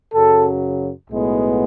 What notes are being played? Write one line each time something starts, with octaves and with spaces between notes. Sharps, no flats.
F#2 C#3 F#3 A4
B1 A2 G#3 B3